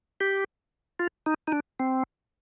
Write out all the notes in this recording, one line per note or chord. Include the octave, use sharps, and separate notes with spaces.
G4
F4
D#4
D#4
D4
C4